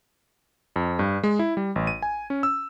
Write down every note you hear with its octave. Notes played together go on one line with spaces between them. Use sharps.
F2
G2
G#3
E4
G3
A1
D#7
G#5
C#4
E6